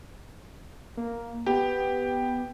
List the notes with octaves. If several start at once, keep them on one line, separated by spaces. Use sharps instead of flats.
A#3
B3 G4